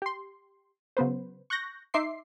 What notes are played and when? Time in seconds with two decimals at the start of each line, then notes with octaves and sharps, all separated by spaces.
0.02 G4 C6
0.97 C#3 F#3 B3 B4 C5
1.50 C#6 F#6 G6 A#6
1.94 D#4 E5 C6 D6 C7